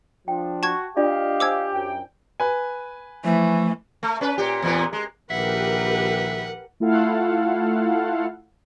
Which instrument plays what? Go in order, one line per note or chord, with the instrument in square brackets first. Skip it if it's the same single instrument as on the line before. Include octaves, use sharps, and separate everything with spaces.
[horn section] F3 D4 [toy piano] G5
[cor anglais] F#4 [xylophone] A5 C#6 G#6
[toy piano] D4 F4 D5 [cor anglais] G4 [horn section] D#5 F5
[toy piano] C5 G#5 [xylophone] D6 E6 G#6
[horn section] F#2 G5
[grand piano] B4 G#5
[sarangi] E3 [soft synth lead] F3 [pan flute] A3
[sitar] A3
C#4 B4
A#2 G4
E2 A#2 B3
G#3
[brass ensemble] A#1 D#3 [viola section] G4 A#4 B4 [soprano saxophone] E5 [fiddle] F#5
[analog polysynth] A3 E4 F4 A4 F5 F#5